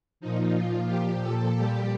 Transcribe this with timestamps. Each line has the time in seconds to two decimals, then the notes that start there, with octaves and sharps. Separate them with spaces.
0.20 A#2 F3 D#4
0.55 F4
0.87 G4
1.22 A4
1.55 A#2 G3 G4